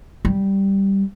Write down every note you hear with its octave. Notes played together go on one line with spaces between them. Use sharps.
G3